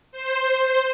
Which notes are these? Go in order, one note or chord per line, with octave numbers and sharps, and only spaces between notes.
C5